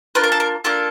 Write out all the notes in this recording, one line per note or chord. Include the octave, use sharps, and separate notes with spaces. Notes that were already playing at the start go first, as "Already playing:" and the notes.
A#3 D4 F4 B4
A#4
A4
A#4
A#3 D4 F4 A4